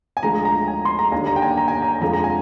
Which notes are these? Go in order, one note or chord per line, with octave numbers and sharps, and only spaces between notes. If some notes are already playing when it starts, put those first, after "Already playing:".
G#5
D2 D3 F3 G#3 A#5
A#5
G#5
C6
A#5
D#2 D3 G3 G#5
A#5
G5
G#5
A#5
G#5
A#5
G#5
F2 D3 F3 G#3 A#5
A#5
G#5